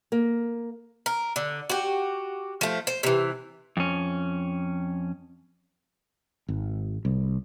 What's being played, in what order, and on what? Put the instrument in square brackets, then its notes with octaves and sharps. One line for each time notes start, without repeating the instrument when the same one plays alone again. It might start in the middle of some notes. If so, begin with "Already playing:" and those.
[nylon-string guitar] A#3
[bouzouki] A#4
D3
F#4 G4
F3 A3
C5
C3 E3
[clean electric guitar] F2 C#4
[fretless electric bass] G#1
C2